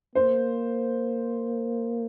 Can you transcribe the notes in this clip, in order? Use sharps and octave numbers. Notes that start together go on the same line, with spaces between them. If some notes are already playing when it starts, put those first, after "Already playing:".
A#3 C5